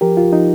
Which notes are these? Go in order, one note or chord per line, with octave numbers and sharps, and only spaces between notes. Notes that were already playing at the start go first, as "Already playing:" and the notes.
F3 G4 A#4
C#2 F4
F3 D#4